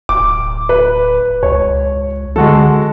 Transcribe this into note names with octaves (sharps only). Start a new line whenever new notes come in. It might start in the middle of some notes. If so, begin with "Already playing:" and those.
D1 D6
B4
C#2 C#5
D3 G#3 F#4 A4